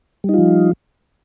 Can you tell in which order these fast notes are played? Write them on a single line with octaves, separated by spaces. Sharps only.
G3 D#4 F4 F3